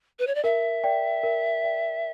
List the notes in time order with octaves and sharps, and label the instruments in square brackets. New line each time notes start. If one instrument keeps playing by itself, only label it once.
[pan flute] B4
C#5
D5
[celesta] A#4 [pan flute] E5
[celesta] D5 G5
A#4
D5 G5